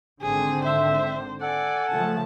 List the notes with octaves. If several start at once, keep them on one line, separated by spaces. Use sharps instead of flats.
G#1 D3 C4 G#4
C5 E5
A4 D5 F#5 G#5
C#3 F3 A3 A5